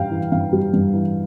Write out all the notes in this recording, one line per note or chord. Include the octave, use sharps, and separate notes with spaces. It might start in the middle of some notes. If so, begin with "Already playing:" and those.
Already playing: G2 G3 F5 G5
E3
G2 F5
G3
G2
E3